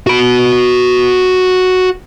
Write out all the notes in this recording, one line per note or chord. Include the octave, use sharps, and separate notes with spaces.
F#4 B5